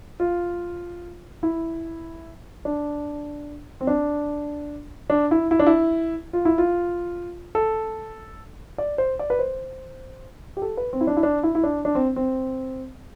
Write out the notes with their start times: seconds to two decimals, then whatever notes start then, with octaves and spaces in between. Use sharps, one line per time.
0.20 F4
1.43 E4
2.65 D4
3.81 C4
3.87 D4
5.10 D4
5.31 E4
5.51 E4
5.59 D4
5.66 E4
6.33 F4
6.45 E4
6.58 F4
7.55 A4
8.78 D5
8.98 C5
9.19 D5
9.30 B4
9.39 C5
10.57 G4
10.62 A4
10.77 B4
10.93 C4
11.01 E4
11.07 D4
11.17 E4
11.23 D4
11.43 E4
11.55 E4
11.63 D4
11.85 D4
11.95 C4
12.16 C4